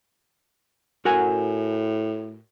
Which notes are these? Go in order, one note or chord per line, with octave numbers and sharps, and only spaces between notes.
A2 F#4 A#4 G#5